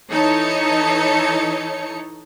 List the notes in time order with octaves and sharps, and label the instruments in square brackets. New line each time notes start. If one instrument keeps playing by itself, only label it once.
[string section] E3 D#4 A4 C#5 C#7